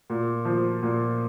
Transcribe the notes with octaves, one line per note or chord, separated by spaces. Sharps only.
A#2
F3
A#2